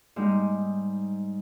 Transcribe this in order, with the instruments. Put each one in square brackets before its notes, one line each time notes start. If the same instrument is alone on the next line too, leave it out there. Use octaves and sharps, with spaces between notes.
[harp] G#2 G3 D#4